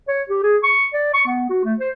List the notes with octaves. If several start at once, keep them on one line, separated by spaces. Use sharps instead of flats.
C#5
G4
G#4
C#6
D5
C#6
B3
F#4
A3
C5